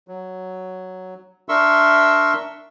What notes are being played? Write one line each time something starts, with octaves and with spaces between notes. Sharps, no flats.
F#3
D4 A#4 E5 C6 C#6 E6